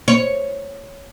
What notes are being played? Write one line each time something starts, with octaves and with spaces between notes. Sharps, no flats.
C#5